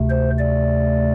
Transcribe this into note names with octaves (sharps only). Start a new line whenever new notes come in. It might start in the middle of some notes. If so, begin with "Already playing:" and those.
Already playing: D2 C3 A3
C5
D5